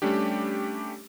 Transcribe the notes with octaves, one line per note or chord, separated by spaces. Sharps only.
G3 A3 C#4 D4 G4